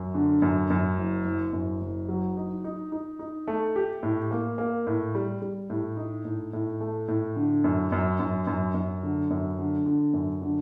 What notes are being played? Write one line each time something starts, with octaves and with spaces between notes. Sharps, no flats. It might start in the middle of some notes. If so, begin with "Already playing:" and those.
Already playing: F#2
D3
F#2
F#2
F#1
F#1
F#2
F#1
F#3
D#4
D#4
D#4
D#4
A3
G4
A2
A#3
A#3
A2
G3
G3
A2
D#4
A2
A2
A3
A2
D3
F#2
F#2
F#2
F#2
F#2
D3
F#2
D3
D3
F#2
D3